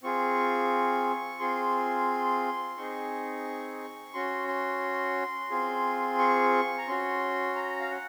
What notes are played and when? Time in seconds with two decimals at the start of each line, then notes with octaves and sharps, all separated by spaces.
0.03 C4 F4 G#4 C#6
1.39 C4 F4 G#4 C6
2.77 C4 D#4 G#4 C#6
4.14 C#4 F#4 C6
4.48 C6
5.51 C4 F4 G#4
6.19 C#6
6.78 A#5
6.88 C#4 F#4 C6
7.56 A#5
7.80 F5
7.91 F#5